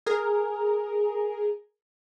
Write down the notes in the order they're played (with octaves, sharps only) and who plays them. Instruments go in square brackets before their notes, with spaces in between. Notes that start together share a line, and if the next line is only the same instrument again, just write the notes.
[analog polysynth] G#4 A#4